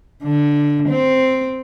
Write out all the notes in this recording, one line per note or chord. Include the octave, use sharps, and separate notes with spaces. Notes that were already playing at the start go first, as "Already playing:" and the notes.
D3
C4